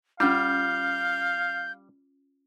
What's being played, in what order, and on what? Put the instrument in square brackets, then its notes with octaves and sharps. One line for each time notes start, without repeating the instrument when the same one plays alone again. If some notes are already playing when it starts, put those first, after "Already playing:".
[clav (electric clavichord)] G3 [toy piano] C#4 F4 [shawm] F5 [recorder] G6